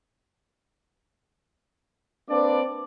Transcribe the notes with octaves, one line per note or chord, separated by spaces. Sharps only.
A#3 C4 D4 B4 D5